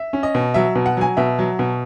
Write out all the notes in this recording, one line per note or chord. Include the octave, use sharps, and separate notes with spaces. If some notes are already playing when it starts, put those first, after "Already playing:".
Already playing: E5
C#4
D#5
B2
F#3 E5
B2
F#5
F#3 G#5
B2 E5
F#3
B2